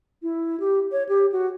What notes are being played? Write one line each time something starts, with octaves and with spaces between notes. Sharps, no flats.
E4
G4
C#5
G4
F#4